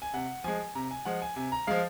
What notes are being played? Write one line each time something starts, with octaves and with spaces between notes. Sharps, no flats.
G#5
C3 F#5
F3 G#3 G#5
C3 A#5
G#5
F3 G#3 F#5
G#5
C3 G#5
A#5
F3 G#3 F5